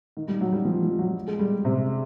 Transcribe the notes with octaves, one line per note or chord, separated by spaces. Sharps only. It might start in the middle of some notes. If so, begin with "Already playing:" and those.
D#3
G3
F#3
G3
F3
F3
F#3
G#3
G3
C3